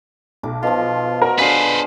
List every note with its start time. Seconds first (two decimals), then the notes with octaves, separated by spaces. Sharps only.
0.43 B1 A4 D6
0.63 B2 F3 F4
1.22 F#4 A#4
1.39 D3 G#4 B4 C5 F5 B6